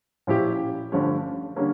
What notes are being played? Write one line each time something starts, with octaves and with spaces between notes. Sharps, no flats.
A#2 F3 C#4 E4 G4
G1 G2 F3 A3 C#4
D3 G3 A#3 C#4